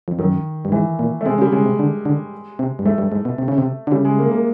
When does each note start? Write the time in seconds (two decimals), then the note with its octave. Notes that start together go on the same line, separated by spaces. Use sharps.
0.08 F2
0.19 F#2 D#3
0.65 G2
0.72 G#2 E3
0.99 A#2
1.21 A3
1.25 C3 G#3
1.38 C#3
1.41 G3
1.52 C#3 G#3
1.65 C3
1.79 D3
2.05 D3
2.59 C3
2.79 G2
2.86 G#2 A3
2.98 G2
3.12 G#2
3.25 B2
3.38 C3
3.48 C#3
3.58 C3
3.87 D3
3.92 C#3 G3
4.05 G#3
4.19 A#3
4.31 A#3